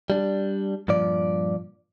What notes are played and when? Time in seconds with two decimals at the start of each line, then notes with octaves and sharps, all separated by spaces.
0.10 G3 D4
0.88 G2 A#2 F3 D5